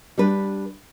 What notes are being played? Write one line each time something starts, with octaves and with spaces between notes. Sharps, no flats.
G3 D4 B4